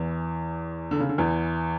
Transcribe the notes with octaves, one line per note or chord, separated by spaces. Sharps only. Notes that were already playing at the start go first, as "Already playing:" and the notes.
Already playing: E2 E3
D3
C#3
D3
E2 E3